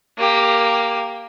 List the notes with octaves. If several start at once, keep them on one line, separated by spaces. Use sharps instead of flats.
A#3 G4